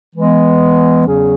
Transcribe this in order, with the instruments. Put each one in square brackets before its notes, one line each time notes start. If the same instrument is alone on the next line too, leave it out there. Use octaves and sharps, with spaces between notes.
[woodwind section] E3 G#3 B3
E2 C#3 F#3 C#4 G#4